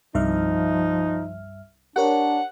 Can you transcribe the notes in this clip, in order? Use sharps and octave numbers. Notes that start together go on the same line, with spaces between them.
C2 G2 F3 D#4 E5 F6
D4 G4 A#4 C#5 F#5